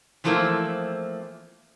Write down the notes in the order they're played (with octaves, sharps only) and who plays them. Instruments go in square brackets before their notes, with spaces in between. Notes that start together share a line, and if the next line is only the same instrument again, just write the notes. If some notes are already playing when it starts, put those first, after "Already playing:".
[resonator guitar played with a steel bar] E3 F3 A3 A#3 C4 E4